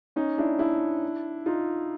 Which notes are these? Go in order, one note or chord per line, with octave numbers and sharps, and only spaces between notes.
C#4 D#4
D4 E4
D4 E4
D#4 F4